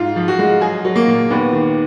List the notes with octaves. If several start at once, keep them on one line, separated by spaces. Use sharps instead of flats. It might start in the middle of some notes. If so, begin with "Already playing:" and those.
Already playing: G#2 F4
F3
F#4
G#3
F#3 G#4
F#3
A#3
A#2
D#2 B3
D#3